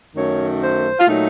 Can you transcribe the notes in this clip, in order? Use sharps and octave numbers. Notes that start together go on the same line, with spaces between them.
F#2 D#3 A3 C#5
C5
F4
A#2 F#3 A3 D#4